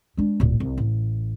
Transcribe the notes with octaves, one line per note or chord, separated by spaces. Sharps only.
G#3 D4
D1 A#2
C2
A1